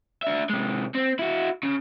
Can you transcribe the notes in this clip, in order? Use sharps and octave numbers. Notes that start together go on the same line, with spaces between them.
D4 E5
C3 G#3
C4
E4 F#4
C#3